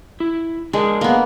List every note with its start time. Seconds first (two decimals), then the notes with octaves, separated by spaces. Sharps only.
0.20 E4
0.73 G#3 D4 G#4 A#4
1.01 A#3 B3